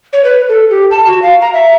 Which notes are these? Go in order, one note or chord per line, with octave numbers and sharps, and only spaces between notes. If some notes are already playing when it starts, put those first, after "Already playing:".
C#5
B4
A4
G4
A5
F#4
F5
A#5
E5